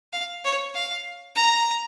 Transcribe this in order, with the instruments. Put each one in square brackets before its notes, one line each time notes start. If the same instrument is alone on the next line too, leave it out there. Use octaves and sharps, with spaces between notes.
[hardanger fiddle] F5
C#5
F5
A#5